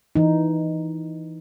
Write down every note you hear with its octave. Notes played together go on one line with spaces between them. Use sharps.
E3 D#4